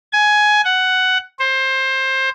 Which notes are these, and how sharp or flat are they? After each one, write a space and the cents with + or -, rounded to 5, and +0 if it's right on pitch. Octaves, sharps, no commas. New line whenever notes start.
G#5 +15
F#5 +10
C5 +20